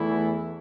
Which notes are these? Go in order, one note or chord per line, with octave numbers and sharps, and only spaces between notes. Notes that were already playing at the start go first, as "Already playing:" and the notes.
Already playing: E2 E3 A3 E4